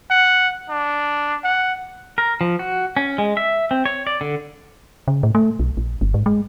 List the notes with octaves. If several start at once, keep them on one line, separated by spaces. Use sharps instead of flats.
F#5
D4
F#5
A#4
F3
F#4
C#4
G#3
E5
C4
C#5
D5
D3
C#3
A2
A3
B1
A#1
G1
G#2
G#3